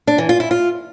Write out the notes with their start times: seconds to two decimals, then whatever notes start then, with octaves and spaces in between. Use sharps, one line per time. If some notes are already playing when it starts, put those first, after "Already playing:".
0.07 D4
0.18 E3
0.29 F4
0.40 E4
0.51 F4